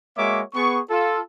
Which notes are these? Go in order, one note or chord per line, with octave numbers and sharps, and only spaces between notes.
G#3 A#3 F#4 C#5 E5 D6
B3 G#4 C#6
F4 A4